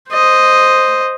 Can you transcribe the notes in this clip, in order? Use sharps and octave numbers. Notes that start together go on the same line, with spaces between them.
C5 D#5